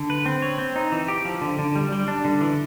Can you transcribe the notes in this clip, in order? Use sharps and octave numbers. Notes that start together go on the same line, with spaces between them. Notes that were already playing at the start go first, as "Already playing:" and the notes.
Already playing: D3
B4
C4
C#5
C4
D#4
E3
G4
F3
D3
D3
G3
G3
D4
D3
E3